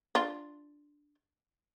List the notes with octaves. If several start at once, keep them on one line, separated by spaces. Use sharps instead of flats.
D4 F4